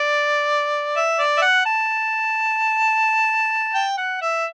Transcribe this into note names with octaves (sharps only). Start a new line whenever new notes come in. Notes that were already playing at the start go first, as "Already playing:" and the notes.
Already playing: D5
E5
D5
E5
F#5
A5
G5
F#5
E5